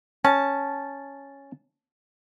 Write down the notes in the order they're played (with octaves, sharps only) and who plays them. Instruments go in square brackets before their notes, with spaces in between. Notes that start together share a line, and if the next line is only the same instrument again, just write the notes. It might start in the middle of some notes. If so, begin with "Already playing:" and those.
[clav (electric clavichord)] C#4 [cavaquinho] A5